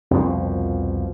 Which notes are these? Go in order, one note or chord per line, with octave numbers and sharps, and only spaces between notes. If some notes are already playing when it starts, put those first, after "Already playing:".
C2 F2 B2 F3